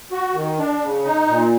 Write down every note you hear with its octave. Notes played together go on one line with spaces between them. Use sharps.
F#4
D#3
D4
C#3
D#4
A#2